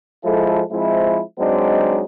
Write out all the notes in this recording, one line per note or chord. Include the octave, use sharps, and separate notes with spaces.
F3 G#3 E4 A4
F3 G#3 C4 E4
F#3 G#3 C4 D4 D#4